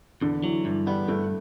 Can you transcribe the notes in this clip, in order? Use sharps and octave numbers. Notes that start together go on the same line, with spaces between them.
E2 D3
E3 F#3
G2 E3
G3 B3
G2 A3